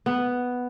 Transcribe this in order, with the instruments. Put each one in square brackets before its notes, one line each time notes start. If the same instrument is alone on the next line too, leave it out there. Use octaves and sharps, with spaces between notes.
[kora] B3